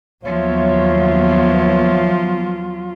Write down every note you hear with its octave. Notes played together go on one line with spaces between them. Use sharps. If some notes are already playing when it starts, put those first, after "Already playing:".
D#2 F3 F#3 B3 F4 C#5 E5